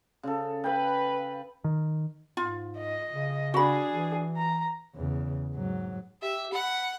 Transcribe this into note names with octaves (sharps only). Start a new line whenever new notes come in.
C#3 A4
B4 F5 G5
D#3
G#2 F4
D#5
C#3
D4 F#4 G#4 B5
E3
A#5
E2 C#3
G#2 F#3
G4 E5
F#5 B5